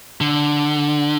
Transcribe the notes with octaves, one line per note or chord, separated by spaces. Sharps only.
D3